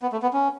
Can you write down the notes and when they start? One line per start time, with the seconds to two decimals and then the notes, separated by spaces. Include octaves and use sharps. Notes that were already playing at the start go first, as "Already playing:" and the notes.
0.02 B3
0.12 A3
0.22 B3
0.33 C#4